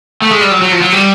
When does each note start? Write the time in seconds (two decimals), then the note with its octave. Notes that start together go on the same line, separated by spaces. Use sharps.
0.22 A3
0.31 G#3
0.41 G3
0.51 F#3
0.62 F#3
0.72 F3
0.82 F#3
0.93 G3